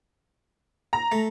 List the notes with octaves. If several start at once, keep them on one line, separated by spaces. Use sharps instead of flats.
A#5
A3